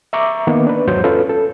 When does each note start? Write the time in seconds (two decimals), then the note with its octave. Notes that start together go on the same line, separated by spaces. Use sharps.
0.13 E5 A#5 C#6 D6
0.47 D#3 A#3 B3
0.67 D4 B4
0.88 E2 G#2 F#3 C5 G6
1.04 C#4 F4 A4 B4
1.29 A4